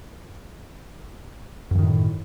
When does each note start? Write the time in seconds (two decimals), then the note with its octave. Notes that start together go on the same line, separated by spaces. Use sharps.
1.71 F#2
1.75 E3
1.79 D#3
1.83 A2